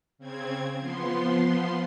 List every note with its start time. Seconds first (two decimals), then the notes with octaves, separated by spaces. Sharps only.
0.18 C#3 C4 G#6
0.79 F3 B3 C6